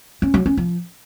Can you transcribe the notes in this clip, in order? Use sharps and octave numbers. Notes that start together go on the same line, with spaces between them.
C#4
F#3
C#4
F3